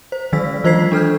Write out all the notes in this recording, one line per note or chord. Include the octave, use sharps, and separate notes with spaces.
C5
D#3 F#3 G#3 E6 B6
E3 F4 C5 G#6 B6 C7
D4 A4 F6 G6